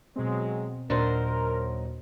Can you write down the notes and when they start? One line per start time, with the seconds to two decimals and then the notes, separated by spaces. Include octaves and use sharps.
0.16 B2 F#3 G#3 C4
0.90 D#2 A#2 F#3 D4 D#4 A#4 C5